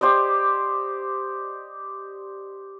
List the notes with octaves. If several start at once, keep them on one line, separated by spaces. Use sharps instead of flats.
G4 C5 D5 D#5